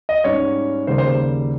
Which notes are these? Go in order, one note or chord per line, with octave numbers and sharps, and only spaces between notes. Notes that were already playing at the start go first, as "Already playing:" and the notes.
D#5
G#2 G3 C#4 C#5
D#2 C#3 G3 A#3 C5
C5